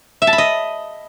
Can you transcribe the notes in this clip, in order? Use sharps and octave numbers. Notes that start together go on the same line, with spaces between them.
E5
A5
B5
D#5